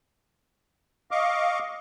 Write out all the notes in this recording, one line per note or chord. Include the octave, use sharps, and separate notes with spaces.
D#5 F5 C#6 D6